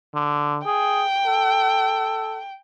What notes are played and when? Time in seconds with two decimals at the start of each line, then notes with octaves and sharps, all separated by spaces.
0.15 D3
0.66 G#4 G5
1.27 A4